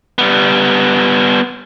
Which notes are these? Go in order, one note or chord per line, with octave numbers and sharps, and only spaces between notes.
G3 B3